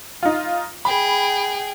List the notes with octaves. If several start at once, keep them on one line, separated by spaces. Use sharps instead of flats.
D#4 F4
G#4 G5 B5